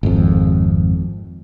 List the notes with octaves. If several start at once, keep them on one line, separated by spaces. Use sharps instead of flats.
G#1 F2